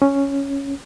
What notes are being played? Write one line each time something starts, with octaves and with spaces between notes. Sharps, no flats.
C#4